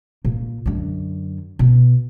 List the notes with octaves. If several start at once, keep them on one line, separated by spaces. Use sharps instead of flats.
A#2
F#2 D3
B2